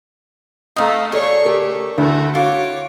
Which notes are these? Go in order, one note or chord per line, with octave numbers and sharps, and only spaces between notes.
A3 D#4 F5 A#5 D#6
D2 G#4 A4 C#5 D5 C#6
C#3 A3 G4 A#4
D2 A3 E4 F#4
F4 F#4 C#5 D6